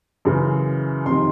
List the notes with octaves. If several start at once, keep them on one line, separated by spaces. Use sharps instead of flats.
F#2 C#3 E3
F2 C3 D#3 C6